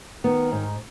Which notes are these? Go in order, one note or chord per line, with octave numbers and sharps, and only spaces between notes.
D#3 B3
G#2